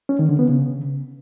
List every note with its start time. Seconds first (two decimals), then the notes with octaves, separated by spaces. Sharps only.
0.09 C#4
0.19 D#3
0.29 D3
0.39 B3
0.49 C#3